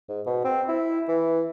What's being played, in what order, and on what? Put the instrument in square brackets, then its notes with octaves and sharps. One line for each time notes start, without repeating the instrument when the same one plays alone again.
[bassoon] G#2
B2
C4
E4
E3